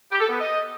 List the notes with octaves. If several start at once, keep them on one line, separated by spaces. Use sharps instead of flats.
G4
A4
B3
D#5